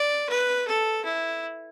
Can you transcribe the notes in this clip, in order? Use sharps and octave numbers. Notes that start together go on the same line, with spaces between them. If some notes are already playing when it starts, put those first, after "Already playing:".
Already playing: D5
B4
A4
E4